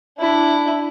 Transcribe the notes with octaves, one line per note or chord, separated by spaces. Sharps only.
D4 E4